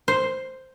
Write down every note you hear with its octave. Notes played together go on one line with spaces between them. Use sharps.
C5